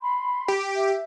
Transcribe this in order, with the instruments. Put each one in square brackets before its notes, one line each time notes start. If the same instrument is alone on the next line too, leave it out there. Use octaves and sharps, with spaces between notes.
[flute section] B5 C6
[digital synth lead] G4
[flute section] E5